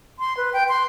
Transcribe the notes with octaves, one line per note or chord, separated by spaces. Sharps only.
C6
B4
G5
C6